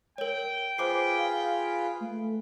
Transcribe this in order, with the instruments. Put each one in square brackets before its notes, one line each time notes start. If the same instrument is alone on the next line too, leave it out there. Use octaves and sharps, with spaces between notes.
[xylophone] A#4 C#5 [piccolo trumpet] G5
[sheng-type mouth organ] F4 G#4 B4 [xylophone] C5 D6 C7
[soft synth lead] F5
A3